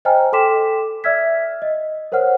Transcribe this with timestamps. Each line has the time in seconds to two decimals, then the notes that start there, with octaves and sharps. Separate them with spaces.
0.05 C5 D#5 G5 G#5 A#5 F6
0.33 A4 G5 C6 D6 B6 E7
1.04 D5 E5 E6 F6 G#6 B6
1.62 D#5
2.12 A#4 C5 C#5 F#5 F6